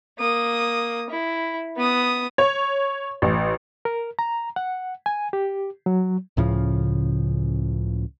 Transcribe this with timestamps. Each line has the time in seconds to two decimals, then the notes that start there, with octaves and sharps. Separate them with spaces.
0.19 A#3 D#6
1.10 E4
1.77 B3 D#6
2.38 C#5
3.22 A1
3.85 A#4
4.19 A#5
4.56 F#5
5.06 G#5
5.33 G4
5.86 F#3
6.37 C#2 A2 C#3 F3